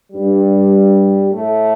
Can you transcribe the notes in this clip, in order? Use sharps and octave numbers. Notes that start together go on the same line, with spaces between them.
G2 G3
A2 A3